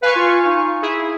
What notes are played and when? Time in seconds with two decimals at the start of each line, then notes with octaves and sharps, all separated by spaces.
0.02 B4 F5 G#5 C#6
0.16 F4
0.46 D#4
0.82 E4 G#4